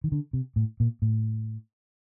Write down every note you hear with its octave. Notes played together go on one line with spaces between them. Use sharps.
D#3
D3
C3
A2
A#2
A2